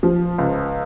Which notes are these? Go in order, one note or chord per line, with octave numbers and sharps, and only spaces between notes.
F3
C#2